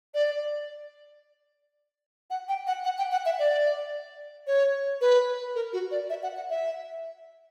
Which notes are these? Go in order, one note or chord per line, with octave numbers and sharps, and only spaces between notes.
D5
F#5
G5
F#5
F#5
G5
F#5
E5
D5
C#5
B4
A#4
F#4
D5
E5
F#5
F#5
E5